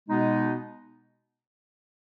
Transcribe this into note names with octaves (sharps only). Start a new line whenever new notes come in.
B2 G#3 B3 D#4